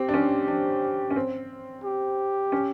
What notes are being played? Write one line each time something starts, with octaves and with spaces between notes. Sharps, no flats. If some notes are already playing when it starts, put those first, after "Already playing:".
Already playing: C4 G4
D4
C#4
D4
C#4
C4
G4
C#4